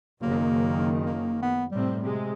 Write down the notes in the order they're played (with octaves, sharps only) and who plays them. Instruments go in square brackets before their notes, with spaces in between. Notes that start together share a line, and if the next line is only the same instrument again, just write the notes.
[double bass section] F#1 D#3 [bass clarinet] A#3
[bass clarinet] A#3
B3
[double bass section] A2 C3 C4 [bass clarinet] G3
[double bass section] C3 G#3